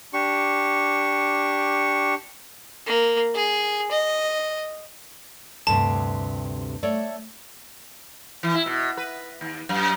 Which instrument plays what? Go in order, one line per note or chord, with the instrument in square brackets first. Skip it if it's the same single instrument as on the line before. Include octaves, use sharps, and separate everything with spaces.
[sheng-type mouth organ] D4 G4 C#6
[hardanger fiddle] A#3
G#4
D#5
[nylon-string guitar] D2 G2 C3 [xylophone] A5
[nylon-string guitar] A3 C#5 D5
[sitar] E3
E4
B2
B4
D#2
F#2